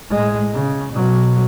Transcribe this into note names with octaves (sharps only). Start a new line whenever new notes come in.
A2 G#3
C#3
B2 F#3